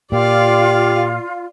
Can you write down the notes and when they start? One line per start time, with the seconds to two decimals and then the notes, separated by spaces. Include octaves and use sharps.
0.12 A#2 F4 G4 D5 F5